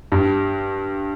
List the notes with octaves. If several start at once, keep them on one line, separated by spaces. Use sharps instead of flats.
G2